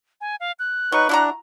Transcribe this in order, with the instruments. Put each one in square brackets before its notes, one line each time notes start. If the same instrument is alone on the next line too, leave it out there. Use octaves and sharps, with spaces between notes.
[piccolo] G#5
F5
F#6
[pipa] F#3 [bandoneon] D#4 B4 C#6
[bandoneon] D4 [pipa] E4 F#4 A#5